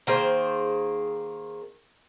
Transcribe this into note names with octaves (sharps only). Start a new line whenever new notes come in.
D#3 A#3 G#4 C5